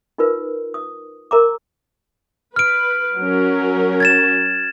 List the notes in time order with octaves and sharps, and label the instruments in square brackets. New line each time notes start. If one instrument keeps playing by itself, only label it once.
[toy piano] D#4 F4 A#4 B4
D#6
A#4 A#5 D6
[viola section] B4 [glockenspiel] F6 D7
[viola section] F#3 C#4 A#4
[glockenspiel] G#6 A6 E7